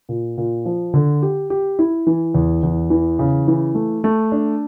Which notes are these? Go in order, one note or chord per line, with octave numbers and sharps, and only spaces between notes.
A#2
A#2
F3
D3
G4
G4
E4
E3
E2
E2
E3
C#3
E3
A3
A3
D4